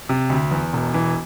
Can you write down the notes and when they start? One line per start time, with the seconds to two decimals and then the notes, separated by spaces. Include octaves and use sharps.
0.09 C3
0.30 D2
0.51 E2
0.73 E1
0.94 E3